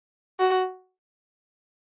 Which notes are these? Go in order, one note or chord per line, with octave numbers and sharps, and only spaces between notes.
F#4